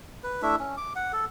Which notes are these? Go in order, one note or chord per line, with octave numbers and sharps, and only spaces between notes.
B4
A3 D4 E4 E5
C#4
D6
F#5
A4